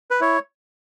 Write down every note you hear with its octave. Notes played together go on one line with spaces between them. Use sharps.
B4
E4 C#5